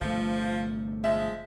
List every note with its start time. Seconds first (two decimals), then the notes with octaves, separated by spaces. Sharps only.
0.01 G1 C3 F3 A3
1.04 F3 G#3 E5